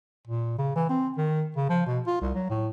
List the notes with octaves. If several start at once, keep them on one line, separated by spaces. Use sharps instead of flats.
A#2
C#3
E3
C4
D#3
C#3
F3
B2
F4
C2
F#3
A2